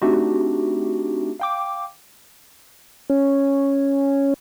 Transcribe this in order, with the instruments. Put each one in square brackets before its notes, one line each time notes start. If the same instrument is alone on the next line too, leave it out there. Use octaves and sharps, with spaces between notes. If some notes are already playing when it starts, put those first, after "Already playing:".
[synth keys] A3 C4 D4 D#4 F#4 G4
F5 G5 D6
[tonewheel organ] C#4